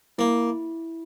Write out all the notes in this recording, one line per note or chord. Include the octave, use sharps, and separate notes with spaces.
A#3 E4